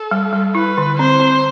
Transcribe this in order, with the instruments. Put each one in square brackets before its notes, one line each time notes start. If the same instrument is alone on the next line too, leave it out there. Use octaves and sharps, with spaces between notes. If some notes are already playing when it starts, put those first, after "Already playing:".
Already playing: [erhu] A4
[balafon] G3
G3
[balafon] E4 [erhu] B4
[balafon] D3
[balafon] C4 [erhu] C5
[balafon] C4